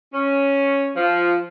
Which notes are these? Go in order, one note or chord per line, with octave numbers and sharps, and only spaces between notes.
C#4
F3